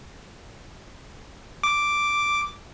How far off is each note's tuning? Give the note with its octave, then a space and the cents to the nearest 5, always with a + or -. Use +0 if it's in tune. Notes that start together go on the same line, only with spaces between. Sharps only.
D6 +0